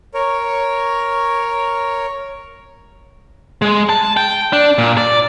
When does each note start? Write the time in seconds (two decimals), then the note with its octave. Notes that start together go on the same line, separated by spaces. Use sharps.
0.14 A#4 C#5
3.62 G#3
3.89 A5
4.17 G5
4.53 D4
4.78 A#2
4.97 D5